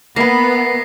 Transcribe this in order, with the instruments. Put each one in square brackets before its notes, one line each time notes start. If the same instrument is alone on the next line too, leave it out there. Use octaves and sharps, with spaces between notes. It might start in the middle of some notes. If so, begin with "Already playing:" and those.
[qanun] A#3 B4 [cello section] B3 [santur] D4 E5 B5 [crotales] A#6 C7